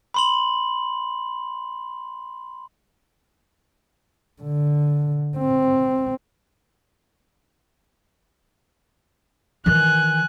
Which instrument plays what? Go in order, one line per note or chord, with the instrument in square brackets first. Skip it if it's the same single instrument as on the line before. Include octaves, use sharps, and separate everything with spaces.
[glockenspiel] B5 C6 F#7
[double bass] D3
C4
[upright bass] D#3 E3 [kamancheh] G#5 F#6